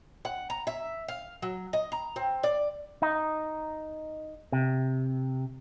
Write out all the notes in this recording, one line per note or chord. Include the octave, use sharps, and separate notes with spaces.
F#5
A#5
E5
F5
F#3
D#5
A#5
C4
D5
D#4
C3